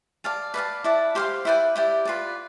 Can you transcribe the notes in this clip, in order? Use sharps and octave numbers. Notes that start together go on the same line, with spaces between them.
D5 F5 A5
B4 D5 F5 A5
E4 B4 D5 A5
G4 C5 F5 C6
E4 B4 D5 G5
E4 G4 D5
F4 B4 D5